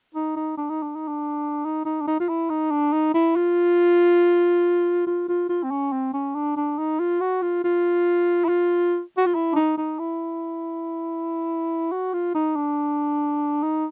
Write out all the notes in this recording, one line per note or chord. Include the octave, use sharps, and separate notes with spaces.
D#4
D#4
D4
D#4
D4
D#4
D4
D#4
D#4
D4
D#4
F4
E4
D#4
D4
D#4
E4
F4
F4
F4
F4
C4
C#4
C4
C#4
D4
D4
D#4
F4
F#4
F4
F4
E4
F4
F#4
F4
E4
D4
D#4
D#4
E4
F#4
F4
D#4
D4
D#4